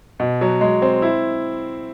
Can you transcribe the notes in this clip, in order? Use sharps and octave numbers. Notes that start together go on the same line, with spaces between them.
B2
F#3
G#3
C4
E4